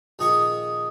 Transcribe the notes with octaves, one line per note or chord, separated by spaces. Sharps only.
A#1 D#3 G#4 D#5 C#6 D#6